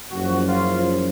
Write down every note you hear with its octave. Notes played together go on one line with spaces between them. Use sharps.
F#1 F#2 F3 F#4
F4